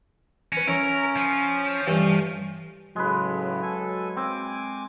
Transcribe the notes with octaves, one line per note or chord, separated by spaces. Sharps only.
C#4 B4 A#5
C#4 E4 A#4 C#5
F3
G2 E3 A3
A2 C#3 F#3 G#3 B4
A4 G#5
C4 G#5 D6